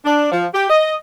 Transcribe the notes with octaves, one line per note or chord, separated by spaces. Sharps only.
D4
F3
G4
D#5